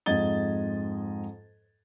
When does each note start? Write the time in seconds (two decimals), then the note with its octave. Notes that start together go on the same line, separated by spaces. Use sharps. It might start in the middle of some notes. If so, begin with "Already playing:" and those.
0.06 F2 G#2 D#5 G#6 A6 G7